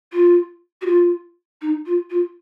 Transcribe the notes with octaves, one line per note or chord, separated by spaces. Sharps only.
F4
F#4
F4
D#4
F4
F4